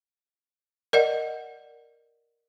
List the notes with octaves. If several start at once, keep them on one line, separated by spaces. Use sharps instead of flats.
A#4 D5 D#5 F#5